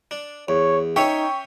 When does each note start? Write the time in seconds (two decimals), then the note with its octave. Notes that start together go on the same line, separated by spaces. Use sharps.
0.11 D4
0.48 E2 C#5
0.96 C#4 D#4 C#5 E5 G5 C#6